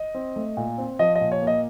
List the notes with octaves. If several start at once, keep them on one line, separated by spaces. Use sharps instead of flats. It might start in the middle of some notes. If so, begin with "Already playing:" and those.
Already playing: D#5
C4
A3
A#2
C4
F3 D#5
D#5
A#2
C#5
A#3
D#5